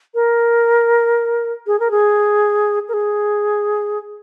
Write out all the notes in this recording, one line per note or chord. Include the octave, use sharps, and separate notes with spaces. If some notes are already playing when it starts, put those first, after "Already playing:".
A#4
G#4
A#4
G#4
A#4
G#4